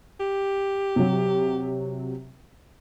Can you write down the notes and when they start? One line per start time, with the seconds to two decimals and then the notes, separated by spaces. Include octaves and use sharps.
0.20 G4
0.96 C3 F#3